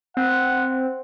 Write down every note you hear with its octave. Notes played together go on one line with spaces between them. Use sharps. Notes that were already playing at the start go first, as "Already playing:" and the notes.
C4 F#5